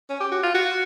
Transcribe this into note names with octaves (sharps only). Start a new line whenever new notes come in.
C#4
G4
F#4
F4
F#4